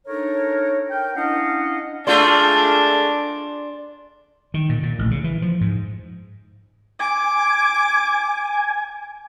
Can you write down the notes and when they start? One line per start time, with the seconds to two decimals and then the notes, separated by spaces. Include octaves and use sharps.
0.08 D4 D#4 A4 A#4 C#5
0.91 A#4 G5
1.16 C#4 D4 E4 D#5 F5 F#5
2.07 G#3 A3 D4 F4 D5 C6
4.54 D#3
4.69 A#2
4.83 A#2
4.99 A1
5.11 C#3
5.24 E3
5.42 F3
5.61 G#2
7.00 G#5 D6